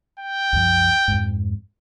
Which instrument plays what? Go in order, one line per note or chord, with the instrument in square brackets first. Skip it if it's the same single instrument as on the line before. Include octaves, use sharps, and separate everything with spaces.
[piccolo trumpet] G5
[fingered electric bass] C2 F#2 F3
F2 G#2